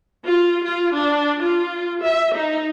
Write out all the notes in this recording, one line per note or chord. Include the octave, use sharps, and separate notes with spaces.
F4
F4
D4
F4
E5
D#4